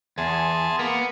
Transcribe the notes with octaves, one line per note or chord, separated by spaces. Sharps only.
E2 G#4 A5 C6
A#3 B3